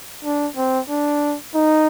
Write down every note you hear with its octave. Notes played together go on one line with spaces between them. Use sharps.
D4
C4
D4
D#4